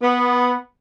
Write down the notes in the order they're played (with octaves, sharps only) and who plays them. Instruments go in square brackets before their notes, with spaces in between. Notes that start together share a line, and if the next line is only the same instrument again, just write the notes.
[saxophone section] B3